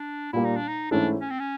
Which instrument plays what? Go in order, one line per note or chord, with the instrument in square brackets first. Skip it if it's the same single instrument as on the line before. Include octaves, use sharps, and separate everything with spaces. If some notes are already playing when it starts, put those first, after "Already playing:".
Already playing: [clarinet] D4
[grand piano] A#2 G3 A#3 [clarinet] E4
[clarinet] D#4
D4
D#4
[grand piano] G#2 E3 A3 C#4 E4 [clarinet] D4
[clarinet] C#4
C4
C#4